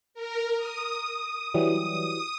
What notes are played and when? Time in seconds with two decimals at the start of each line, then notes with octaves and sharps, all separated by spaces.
0.14 A#4
0.57 D#6
1.54 E3 F#3 G3